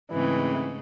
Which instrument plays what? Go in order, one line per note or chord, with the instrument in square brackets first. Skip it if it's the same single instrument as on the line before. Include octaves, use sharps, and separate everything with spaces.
[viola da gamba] G#2 C#3 A3 [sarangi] E3 [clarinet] C4